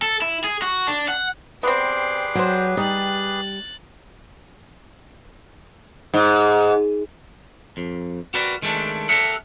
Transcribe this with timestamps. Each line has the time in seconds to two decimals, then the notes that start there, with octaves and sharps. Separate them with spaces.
0.02 A4
0.22 E4
0.44 G#4
0.62 F#4
0.88 D4
1.08 F#5
1.63 B3 C4 G4 G#4 B4 D5 C6
2.35 F#3 C4 C5
2.77 G3 D#4 F#6 A6
6.14 G#2
7.77 F2
8.34 F#4 G4 A#4 B4 D5
8.62 D#3 G#3 A3 C#4 D4
9.09 G4 A4 A#4 E5 F#5